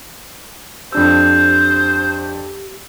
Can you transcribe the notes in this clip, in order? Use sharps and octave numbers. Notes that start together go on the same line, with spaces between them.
F2 D4 G4 C5 E6